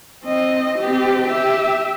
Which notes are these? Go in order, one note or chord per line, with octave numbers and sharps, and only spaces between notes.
C4 D#5
C4 G4
G4 E5